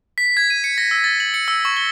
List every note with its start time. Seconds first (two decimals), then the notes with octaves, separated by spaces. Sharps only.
0.18 B6
0.37 G#6
0.50 D#7
0.64 C#7
0.78 A#6
0.91 E6
1.04 A6
1.20 F#7
1.34 C#7
1.48 E6
1.65 C#6
1.77 G7